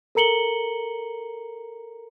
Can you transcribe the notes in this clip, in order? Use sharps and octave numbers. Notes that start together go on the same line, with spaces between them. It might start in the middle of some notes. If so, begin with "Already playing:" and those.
A4 A#4 A#5 C#7 F#7 G7